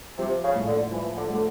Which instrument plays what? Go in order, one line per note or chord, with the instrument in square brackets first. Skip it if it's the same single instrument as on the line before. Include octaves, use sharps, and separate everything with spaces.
[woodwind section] C3 [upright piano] F3
[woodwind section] C#3
[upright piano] A2
[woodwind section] D3
[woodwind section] E3 [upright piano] F3
[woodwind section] D3
[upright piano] A3
[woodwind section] D3